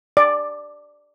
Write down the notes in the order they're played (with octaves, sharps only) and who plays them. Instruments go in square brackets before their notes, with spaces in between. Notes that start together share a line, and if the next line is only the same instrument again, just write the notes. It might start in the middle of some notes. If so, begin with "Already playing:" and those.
[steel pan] D5